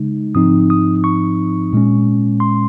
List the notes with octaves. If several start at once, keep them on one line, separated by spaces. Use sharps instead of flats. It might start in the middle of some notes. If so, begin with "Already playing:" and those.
Already playing: C#3 G#3 D#4
G#2 F3 C4 D#4 D#6
D#6
C#6
A#2 G#3 C#4
C6